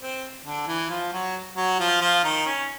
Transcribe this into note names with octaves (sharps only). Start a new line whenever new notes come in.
C4
D3 D4
E3 E4
F3 F4
F#3 F#4
F#3 F#4
F3 F4
F3 F4
D#3 D#4
C#4